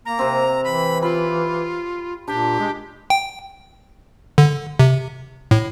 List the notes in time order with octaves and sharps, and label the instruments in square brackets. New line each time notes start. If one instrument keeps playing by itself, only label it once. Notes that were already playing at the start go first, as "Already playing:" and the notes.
[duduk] A#3 [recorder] A#5
[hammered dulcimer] C3 C4
[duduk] E3 [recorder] B5
[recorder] F4 [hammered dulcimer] B5
[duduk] A#2 [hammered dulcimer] D4 [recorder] G4
[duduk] G#3
[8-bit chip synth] G5
D3
C3
A2